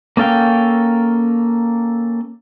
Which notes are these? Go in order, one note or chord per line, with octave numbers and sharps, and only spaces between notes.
A#3 C#4 A4 F5 G5